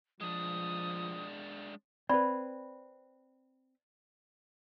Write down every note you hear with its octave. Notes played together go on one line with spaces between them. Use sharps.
F3 G#3 D4 D#6
C4 B4 D5 B5